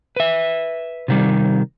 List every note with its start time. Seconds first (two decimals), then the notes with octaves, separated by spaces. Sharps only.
0.16 B4 E5
1.08 C3 D#3 G3